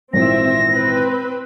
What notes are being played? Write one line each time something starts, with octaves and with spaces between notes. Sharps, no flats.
G#1 A#2 E3 C4 E5 A#6
C4 B4